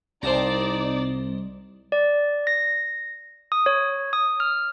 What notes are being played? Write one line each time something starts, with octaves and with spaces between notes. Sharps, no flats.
C2 D#4 C5 D5 A5 A#5
D5
A#6
D#6
C#5
D#6
F6